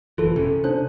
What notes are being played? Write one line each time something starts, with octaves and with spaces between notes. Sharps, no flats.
F#1 E3 F4 A4
C3 C#4
D4 C5 F#6